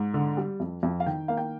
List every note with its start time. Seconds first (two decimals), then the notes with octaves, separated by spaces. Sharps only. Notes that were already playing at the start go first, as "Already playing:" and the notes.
Already playing: G#2
0.14 D3
0.37 G3
0.60 F2
0.83 F2
1.00 F5
1.06 D#3 G5
1.28 A#3 F5
1.37 G5